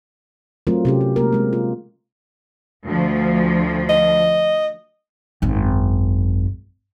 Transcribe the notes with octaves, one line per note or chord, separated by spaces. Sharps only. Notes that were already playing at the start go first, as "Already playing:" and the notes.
F#3 A3 C4 F4 A#4
C3 C#4 G4
F4
G#3 A#3 A#4
G#3 C4
F4
D2 F3
D#5
G#1 F#2